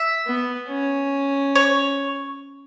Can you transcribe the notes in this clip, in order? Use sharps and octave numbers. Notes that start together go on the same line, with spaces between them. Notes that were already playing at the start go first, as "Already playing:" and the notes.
Already playing: E5
B3
C#4
C#5